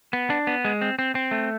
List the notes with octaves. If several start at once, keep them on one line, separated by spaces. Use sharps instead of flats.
B3
D4
B3
G#3
C4
C4
C4
A3